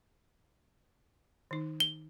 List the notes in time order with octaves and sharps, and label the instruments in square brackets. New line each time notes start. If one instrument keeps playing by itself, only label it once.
[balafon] D#3 D#4
[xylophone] G7